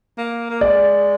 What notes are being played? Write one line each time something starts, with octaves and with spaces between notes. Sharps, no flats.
A#3
A#3
G#3 D5